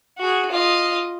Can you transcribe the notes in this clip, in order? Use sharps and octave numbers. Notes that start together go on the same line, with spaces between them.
F#4 G#4
F4 D#5